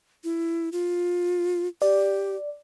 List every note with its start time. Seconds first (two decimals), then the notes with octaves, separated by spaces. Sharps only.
0.24 E4
0.72 F4
1.82 G4 D5